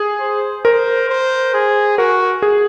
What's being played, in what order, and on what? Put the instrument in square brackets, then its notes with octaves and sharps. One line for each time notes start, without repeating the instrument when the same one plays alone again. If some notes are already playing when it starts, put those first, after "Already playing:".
Already playing: [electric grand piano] G#4
[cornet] C5
[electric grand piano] A#4 [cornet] C5
[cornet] C5
G#4
[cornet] F#4 [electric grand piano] A#4
[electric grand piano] G#4